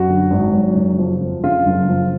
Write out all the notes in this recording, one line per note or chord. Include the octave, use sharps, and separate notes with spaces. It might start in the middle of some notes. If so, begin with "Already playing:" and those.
Already playing: F#2 F#4
D3
G#1
F#3
F#1
F3
F2
C#3 F4
F#1
F3